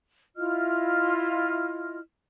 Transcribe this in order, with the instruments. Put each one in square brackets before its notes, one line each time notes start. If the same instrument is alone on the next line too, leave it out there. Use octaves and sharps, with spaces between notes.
[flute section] E4 F4 D#5 F6